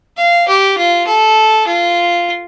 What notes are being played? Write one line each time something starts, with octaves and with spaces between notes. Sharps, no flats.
F5
G4
F4
A4
F4